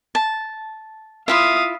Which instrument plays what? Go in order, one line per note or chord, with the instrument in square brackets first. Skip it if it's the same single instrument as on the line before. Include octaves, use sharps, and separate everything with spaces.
[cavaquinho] A5
[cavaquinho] E4 F4 E5 [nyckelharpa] F5 D#6